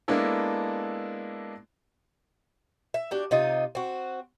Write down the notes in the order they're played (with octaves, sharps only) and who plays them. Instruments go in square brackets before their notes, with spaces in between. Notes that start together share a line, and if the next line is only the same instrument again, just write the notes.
[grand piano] G#3 A#3 B3 D4 E4 A4
[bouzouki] E5
D4 F#4 G4
C3 D#4 F4 D#5
C4 F#4